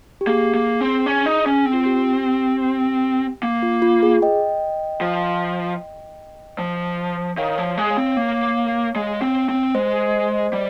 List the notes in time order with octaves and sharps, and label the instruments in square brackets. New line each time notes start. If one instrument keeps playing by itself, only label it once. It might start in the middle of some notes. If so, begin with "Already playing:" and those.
[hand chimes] G4
[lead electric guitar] A#3 [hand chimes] G#4
[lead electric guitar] A#3
C4
C#4
D#4
C#4
C4
[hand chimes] F4
G4
[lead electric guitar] A#3
[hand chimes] F4
F4
G#4
D#5 G5
[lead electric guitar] F3
F3
[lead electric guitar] D#3 [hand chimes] C#5 F5
[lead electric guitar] F3
G#3
[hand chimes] C#5 F5
[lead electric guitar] C4
[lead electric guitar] A#3 [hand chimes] C#5 F5
[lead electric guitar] G#3
C4
C4
[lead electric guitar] G#3 [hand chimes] C5 D#5
[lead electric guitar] G3